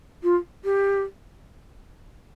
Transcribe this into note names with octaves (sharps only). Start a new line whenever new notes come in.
F4
G4